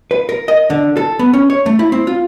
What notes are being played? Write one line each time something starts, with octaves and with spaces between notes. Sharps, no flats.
B4
A#4
D#5
D3
A4
B3
C#4
C#5
A3
E4
C4
F4